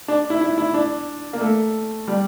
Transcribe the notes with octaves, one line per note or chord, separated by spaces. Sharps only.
D4
E4
E4
E4
D4
A#3
A3
G3